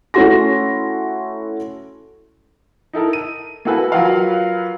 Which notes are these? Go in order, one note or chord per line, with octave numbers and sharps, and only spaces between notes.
A3 C#4 E4 F#4 C6 A#6
D#4 E4 A4 A#4
D#7
A#3 E4 F#4 A4 B4 G#5
F#3 F4 F#4 A#4 B4 F5